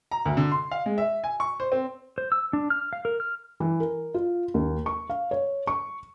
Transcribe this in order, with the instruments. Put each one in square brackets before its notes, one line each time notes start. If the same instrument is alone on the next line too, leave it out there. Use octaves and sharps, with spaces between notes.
[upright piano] A#5
D2
D3
C6
F5
G#3
E5
G#5
C#6
C5
C4
[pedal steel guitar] C5
E6
D4
F6
F5
A#4
F6
[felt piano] E3
A#4
F4
D#2
C#6
F5
C#5
C#6